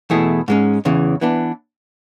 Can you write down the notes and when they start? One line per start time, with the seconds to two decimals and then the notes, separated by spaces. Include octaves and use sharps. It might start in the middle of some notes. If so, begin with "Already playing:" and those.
0.10 E2 B2 A3 E4 G#4
0.48 G#2 G#3 C#4
0.85 E2 C#3 E3
1.21 E3 B3 D4